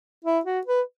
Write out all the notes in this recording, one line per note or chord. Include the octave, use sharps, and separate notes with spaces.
E4
F#4
B4